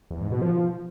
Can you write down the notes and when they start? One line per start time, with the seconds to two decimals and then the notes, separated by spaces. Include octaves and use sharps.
0.11 E2
0.21 G#2
0.31 B2
0.42 F3